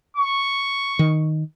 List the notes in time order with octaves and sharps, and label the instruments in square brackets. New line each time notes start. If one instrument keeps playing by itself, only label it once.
[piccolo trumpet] C#6
[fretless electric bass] D#3